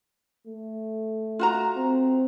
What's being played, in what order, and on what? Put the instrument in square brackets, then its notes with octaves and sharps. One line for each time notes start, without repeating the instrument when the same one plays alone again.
[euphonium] A3
[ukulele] F4 F#4 A#5
[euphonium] C4